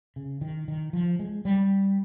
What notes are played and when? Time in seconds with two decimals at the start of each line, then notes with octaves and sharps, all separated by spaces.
0.16 C#3
0.41 D#3
0.68 D#3
0.93 F3
1.19 G#3
1.45 G3